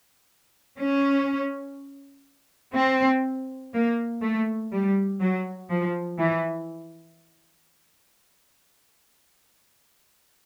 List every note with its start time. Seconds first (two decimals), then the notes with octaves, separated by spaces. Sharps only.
0.78 C#4
2.75 C4
3.74 A#3
4.22 A3
4.72 G3
5.20 F#3
5.70 F3
6.19 E3